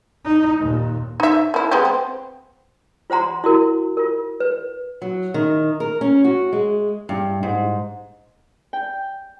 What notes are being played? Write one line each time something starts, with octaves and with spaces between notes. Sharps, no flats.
D#4
D#2 A#2
D#4 E5
A#3 E4
G#3 B3 G4
C4
F4 C5 F#5 A#5 C6
E4 F#4 A#4
F4 A#4
B4
F#3
D#3
A#4
C#4
F#4
G#3
G2
G#2
G5